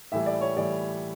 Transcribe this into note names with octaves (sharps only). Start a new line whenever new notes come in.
A2 E3 G3 E5
D5
C#5
A2 E3 G3 D5